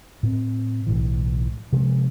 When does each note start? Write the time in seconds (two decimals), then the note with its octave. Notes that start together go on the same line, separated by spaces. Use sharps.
0.23 A2 C4
0.87 B1 A2 E3
1.72 C3 F3 G#3 C#4